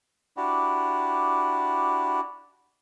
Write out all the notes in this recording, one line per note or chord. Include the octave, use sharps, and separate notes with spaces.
D4 E4 F#4 G4